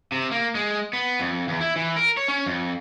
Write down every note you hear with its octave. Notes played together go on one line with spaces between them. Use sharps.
C3
A#3
G#3
B3
F2
E2
E4
E3
A#4
C#5
C#4
F2